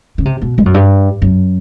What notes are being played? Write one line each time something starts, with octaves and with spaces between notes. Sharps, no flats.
C#3
C3
B2
G2
F#2
G2
F#2